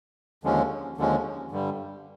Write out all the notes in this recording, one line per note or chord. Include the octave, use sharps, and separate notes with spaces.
D#2 D3 F3 G#3 C#4
D#2 D3 F3 G#3 C#4
G2 D3 G3